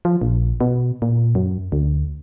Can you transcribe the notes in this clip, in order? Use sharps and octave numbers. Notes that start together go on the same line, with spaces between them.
F3
A#1
B2
A#2
F#2
D2